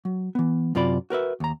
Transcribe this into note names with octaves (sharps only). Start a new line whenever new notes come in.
F#3
E3 B3
F#2 C3 F4 D5 B5
F#4 A#4 B4 E5
D#2 A#5